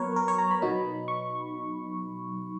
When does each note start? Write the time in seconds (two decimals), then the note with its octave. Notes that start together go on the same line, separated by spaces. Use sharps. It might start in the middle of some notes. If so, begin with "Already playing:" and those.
Already playing: F#3 B3 A#4 B4 C#5
0.16 A#4
0.28 C#5
0.38 A#5
0.51 B5
0.62 B2 F#3 B3 D#4
1.08 C#6